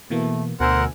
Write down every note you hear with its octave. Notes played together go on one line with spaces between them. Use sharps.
B2 E3 A3 A#3
D2 B2 A#4 C5 F#5 G#5 E6